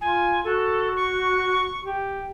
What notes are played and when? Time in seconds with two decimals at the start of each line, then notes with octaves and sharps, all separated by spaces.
0.01 F4 G#5
0.44 F#4 A4
0.96 C#6
1.84 G4